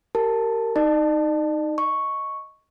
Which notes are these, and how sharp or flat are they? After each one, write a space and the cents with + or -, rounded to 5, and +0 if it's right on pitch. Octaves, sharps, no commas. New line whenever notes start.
G4 -10 A#4 -20 A5 +0
D#4 +0 D5 +45 A5 +0
D#5 +0 C#6 +0